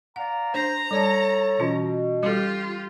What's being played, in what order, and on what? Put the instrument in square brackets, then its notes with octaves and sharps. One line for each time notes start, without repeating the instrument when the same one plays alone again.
[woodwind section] D5 F5 A#5 [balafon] F#5
[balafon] D4 [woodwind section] C5 [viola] A#5
[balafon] G3 D5 A5 [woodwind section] A4 C#5
[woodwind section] B2 [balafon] E3 C#4 F4
[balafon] G3 A4 [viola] F4 G4